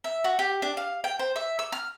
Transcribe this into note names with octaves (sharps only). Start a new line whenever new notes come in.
E5
F#4
G4
D4
F5
G5
C5
E5
E6
F6